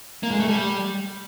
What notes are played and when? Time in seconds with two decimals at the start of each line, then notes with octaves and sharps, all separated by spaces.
0.23 A#3
0.31 G#3
0.40 A3
0.48 G3